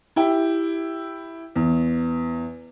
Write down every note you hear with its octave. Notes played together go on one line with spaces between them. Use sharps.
E4 G4 G5
E2